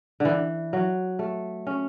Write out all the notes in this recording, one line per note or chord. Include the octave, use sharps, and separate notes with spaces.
D3 E3
F#3
A3
C#4